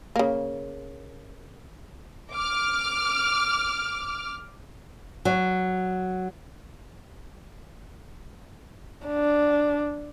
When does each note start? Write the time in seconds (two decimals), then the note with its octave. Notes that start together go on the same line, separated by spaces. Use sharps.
0.16 C#3 A#3
2.33 D6 F6
5.25 F#3
9.07 D4